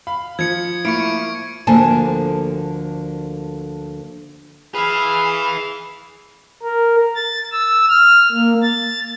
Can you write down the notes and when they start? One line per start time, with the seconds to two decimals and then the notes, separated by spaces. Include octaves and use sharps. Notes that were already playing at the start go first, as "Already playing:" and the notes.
0.07 F5 B5
0.39 F3 G#6 C#7
0.85 A3 A#3 E4 C#6 C#7 D7
1.67 D2 D3 F3 A#3 G#5 A5
4.75 G#4 B4 E5 F5 B5
6.63 A#4
7.15 A6
7.52 E6
7.89 F6
8.32 A#3
8.62 A6